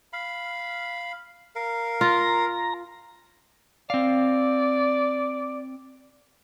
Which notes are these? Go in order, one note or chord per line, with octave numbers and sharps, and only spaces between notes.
F5 B5
A#4 F5
F4 A#5
C4 D5 F5